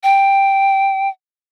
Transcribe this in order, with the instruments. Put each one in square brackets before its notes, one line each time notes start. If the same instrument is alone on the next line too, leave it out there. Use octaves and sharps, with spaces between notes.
[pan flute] G5